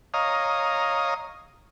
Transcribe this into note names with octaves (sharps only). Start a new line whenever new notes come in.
C#5 D#5 F5 A#5 D#6